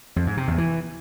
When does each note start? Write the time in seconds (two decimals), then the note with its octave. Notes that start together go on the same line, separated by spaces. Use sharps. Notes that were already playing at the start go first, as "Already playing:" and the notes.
0.16 F2
0.27 G#2
0.37 C3
0.48 E2
0.58 E3